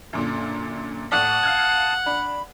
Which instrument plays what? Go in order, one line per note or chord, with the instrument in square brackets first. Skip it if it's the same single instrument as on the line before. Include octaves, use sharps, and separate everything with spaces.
[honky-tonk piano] F#2 A#2 D3
[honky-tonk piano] A2 D5 [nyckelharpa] F#5 [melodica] A5 D#6
[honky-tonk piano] F5 F6 G#6
[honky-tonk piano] D4 [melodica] B5